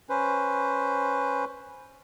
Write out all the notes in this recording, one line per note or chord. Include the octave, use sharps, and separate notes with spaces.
C#4 B4 C5